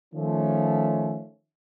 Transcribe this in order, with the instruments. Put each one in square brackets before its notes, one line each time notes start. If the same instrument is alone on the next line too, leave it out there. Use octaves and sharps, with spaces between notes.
[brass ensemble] D#3 F3 A3 C#4